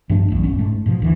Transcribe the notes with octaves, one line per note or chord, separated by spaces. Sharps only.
G2 F3 A3 D4
B1 E2
D1 G1 C#4
G#2 A3
G#2 B2 F3
F#1 D2 E3